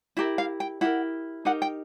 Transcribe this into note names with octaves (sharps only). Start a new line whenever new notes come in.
E4 G4 A#4 E5
F5
G5
E4 G4 A#4 F#5
D#4 G4 A#4 F#5
G5